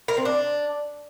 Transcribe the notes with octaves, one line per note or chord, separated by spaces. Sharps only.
A#4
C4
D4